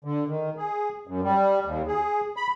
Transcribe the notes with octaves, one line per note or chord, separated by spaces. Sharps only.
D3
D#3
G#4
F#2
G3
D#2
G#4
B5